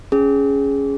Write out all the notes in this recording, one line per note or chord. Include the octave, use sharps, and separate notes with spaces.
C#4 G#4